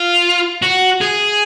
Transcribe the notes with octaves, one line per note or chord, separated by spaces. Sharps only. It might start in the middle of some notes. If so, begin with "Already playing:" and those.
Already playing: F4
F#4
G#4